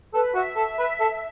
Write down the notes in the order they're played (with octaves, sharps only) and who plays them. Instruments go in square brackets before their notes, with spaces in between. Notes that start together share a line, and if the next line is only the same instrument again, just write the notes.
[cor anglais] A4 [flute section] B4
[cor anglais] F#4 [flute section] E5
[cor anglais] A4
B4
A4